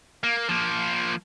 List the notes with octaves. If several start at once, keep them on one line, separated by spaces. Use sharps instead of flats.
A#3
F3 A#3